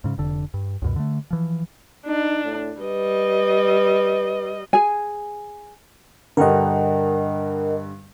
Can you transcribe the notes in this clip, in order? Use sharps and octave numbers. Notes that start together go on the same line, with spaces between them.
G#2 C#3
F1 D3
G2
C#2 F#2 B2
D3 A3
E3 F3
D4 D#4
A2
G3 B4 D#5
G#4 G#5
G2 D3 D4 A#4 D#5 F#5 G5